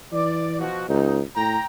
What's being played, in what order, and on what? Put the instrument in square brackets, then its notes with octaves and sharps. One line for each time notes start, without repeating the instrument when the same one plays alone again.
[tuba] E3 [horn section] D5
[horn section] B2 F3 F#4
[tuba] C#2 [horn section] D#4
[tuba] A2 [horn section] G5 A#5